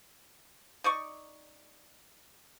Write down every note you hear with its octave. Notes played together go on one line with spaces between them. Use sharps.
D#4 D5 C#6